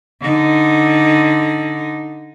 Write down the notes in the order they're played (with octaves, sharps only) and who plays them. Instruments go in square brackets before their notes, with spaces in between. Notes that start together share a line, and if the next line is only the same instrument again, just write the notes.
[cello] D3 D#4